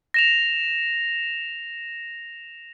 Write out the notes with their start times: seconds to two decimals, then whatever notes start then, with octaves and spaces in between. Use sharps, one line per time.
0.14 A#6 E7 F7